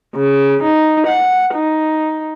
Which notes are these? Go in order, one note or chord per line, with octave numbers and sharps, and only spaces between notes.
C#3
D#4
F#5
D#4